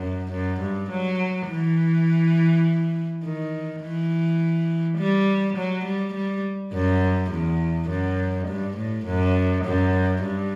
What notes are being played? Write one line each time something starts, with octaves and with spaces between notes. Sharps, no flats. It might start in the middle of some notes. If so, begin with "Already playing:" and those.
Already playing: F#2
F#2
G2
F#3
E3
D#3
E3
G3
F#3
G3
G3
F#2
E2
F#2
G2
A2
F#2
F#2
G2